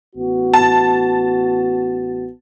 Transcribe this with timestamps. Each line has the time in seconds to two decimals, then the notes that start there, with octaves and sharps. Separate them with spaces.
0.15 A1 B3 F#4
0.54 A5